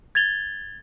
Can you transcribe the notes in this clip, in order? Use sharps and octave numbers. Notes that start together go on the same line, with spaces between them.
G#6 A6 F7 G7